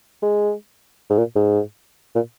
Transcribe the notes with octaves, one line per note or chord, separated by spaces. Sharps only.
G#3
G#2
A#2
G#2
A#2